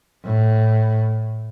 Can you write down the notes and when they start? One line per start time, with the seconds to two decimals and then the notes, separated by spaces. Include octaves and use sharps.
0.25 A2